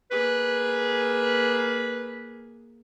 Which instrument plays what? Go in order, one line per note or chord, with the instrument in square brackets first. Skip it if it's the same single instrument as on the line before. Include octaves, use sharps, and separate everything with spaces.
[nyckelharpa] A#3 G#4 [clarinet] B4